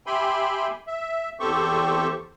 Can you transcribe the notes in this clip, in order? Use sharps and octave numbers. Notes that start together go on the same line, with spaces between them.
G4 E5 G5 G#5 B5 C6
E5
E2 C4 G4 A4 C5 C#6